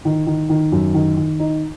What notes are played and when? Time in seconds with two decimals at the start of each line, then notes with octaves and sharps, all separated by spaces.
0.05 D#3
0.27 D#3
0.49 D#3
0.72 F#2
0.94 D#3
1.17 D#3
1.39 D#4